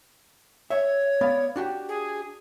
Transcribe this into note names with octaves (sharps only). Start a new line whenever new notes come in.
C#5 E5
B3 D5 F5
D4 F#4 G4
G#4